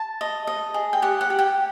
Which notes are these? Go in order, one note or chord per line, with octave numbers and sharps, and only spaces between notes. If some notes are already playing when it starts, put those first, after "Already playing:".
Already playing: A5
D#5
D#5
G#4
G5
G4 F#5
F#5
G4
G5